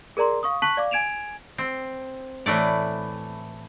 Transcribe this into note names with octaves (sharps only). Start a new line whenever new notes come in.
G#4 A#4 D5 A#5 C6
F5 C#6 D#6
A5 C#6 F#6 B6 F#7
D5 F5 D6
G#5 G#6 D7 E7 F7
C4
A2 E3 A3 D5